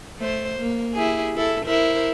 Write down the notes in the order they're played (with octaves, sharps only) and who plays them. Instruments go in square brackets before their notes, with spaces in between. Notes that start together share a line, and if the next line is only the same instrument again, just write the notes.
[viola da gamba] A3 C5
A#3
E4 G4 G#4
E4 A4
E4 A#4 C5